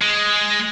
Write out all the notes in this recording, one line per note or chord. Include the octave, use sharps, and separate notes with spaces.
G#3